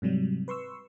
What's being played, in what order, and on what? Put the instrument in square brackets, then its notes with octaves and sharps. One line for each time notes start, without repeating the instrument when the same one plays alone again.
[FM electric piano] G#2 C3 F#3 G3
B4 C6 C#6 E6